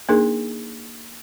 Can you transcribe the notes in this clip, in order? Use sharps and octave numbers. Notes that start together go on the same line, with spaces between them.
A#3 D4 D#4 G#4 A#4